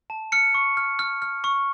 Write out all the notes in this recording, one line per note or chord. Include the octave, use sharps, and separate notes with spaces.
A5
F6 C#7
C#6
F6
F6
F6
C#6